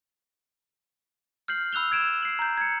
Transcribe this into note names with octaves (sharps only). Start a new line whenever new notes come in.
F6 G6 C7 F#7
B5 E6 F#6 F7 G7
E6 G#6 D7 E7
C7 F#7
A#5 G6
G#6 C#7